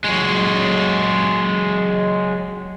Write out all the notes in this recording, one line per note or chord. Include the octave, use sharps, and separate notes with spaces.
F#3 G#3